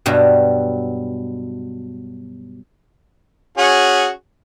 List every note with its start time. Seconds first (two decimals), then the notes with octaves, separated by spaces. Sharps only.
0.06 G2 B2 F#3 G3
3.58 C#4 F#4 G#4